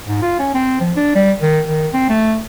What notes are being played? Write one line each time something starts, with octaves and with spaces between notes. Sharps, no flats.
G#2
F4
C#4
C4
F3
D4
G3
D#3
D#3
C4
A3